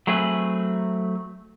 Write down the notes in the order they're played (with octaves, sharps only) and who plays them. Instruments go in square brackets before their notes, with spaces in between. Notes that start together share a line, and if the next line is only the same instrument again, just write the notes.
[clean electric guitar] F#3 A3 C4 G#4 B4